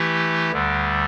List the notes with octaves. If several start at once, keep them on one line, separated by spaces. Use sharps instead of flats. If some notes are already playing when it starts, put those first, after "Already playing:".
Already playing: E3 A3 E4 G4
D2 D3 G3